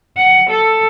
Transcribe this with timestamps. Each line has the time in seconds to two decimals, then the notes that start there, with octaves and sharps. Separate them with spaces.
0.17 F#5
0.50 A4